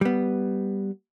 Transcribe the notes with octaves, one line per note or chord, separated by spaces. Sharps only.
G3 B3